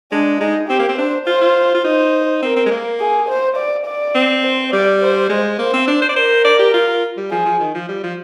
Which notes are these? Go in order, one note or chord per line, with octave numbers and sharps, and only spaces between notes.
G#3 D4
G#3 D#4
C4 G4
A#3
C4
D4 C5
F4 C5
F4
F4
D#4 C5
C4 A#4
C4
G#3
A#3
G#4
C5
D5
D5
C4
C5
G3 D5
C5
G#3
A#3 C5
C4
D4
C5
D5
A#4 C5
D5
G4
F4
G3
F3 G#4
F3
D#3
F3
G3
F3